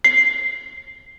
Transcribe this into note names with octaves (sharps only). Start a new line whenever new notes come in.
C7